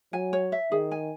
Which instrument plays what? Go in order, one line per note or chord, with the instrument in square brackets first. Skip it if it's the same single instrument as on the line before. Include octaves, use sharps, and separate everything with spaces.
[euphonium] F#3 [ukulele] G#5
[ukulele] C#5
E5
[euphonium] D#3 [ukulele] G#4
[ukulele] G#5